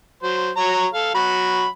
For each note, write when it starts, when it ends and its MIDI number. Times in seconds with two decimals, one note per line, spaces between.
0.23 0.51 54
0.23 0.51 72
0.57 0.86 54
0.57 0.86 73
0.57 0.86 82
0.94 1.11 69
0.94 1.11 77
1.15 1.68 54
1.15 1.68 66
1.15 1.68 83